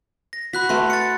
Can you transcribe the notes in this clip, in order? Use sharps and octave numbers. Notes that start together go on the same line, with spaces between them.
A#6
F#4 B5 F#6 B6
A3 A#4 B4 C6
A6 C#7